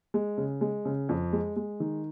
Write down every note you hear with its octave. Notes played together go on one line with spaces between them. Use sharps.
G#3
C#3
G#3
C#3
F2
G#3
G#3
D#3